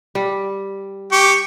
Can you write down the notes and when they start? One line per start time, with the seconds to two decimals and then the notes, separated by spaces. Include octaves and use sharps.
0.15 G3
1.12 G4 C#6